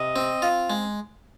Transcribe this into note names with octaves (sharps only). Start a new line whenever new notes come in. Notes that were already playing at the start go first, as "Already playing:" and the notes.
Already playing: C3 D#5
C4
F4
G#3